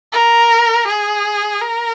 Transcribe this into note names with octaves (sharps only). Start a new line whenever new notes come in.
A#4
G#4
A#4